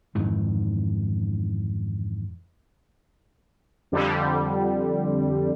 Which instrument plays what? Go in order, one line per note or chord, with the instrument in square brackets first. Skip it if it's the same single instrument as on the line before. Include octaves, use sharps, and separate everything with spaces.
[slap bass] F2 G#2 D#3 E3
[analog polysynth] F2 D3 G3